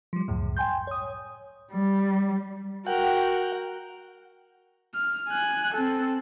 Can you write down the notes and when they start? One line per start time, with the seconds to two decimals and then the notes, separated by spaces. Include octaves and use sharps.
0.13 F3 G3
0.28 C#2 F#2 A2
0.57 G5 G#5 C6 G6
0.87 C#5 D#6
1.75 G3
2.87 F#4 A#4 F#5 G5
4.95 F6
5.29 G#5 F#6
5.75 C4 A4